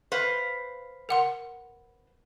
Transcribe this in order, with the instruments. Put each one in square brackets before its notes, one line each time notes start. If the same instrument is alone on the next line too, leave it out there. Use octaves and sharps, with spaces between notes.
[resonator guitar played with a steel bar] B4 C5 F5
[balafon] A#4 F#5 C6